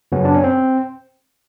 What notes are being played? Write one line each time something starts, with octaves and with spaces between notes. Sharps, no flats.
F#2 C#3 F#3 B3 C#4
D4
C#4
C4